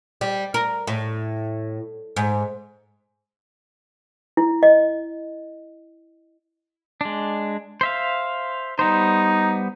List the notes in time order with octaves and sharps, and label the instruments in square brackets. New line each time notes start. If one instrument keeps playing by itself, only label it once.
[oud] G3
A#4
A2
G#2
[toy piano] E4
D#5
[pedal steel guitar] G#3 D4
C5 E5 F5
[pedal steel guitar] G3 B3 C5 [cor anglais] D#4